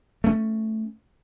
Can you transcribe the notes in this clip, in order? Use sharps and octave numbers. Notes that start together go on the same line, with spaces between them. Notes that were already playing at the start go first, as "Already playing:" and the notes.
A3 C#4